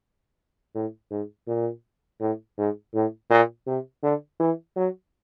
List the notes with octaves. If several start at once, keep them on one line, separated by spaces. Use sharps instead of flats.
A2
G#2
A#2
A2
G#2
A2
A#2
C3
D3
E3
F#3